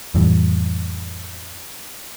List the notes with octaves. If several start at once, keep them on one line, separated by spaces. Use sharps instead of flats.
F2 A2 E3 G3